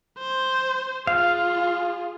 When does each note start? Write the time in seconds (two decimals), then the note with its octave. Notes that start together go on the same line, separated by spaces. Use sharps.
0.19 C5
1.07 F4 G#4 F5